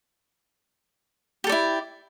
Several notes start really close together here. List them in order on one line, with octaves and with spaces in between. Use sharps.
G4 A4 D5 E4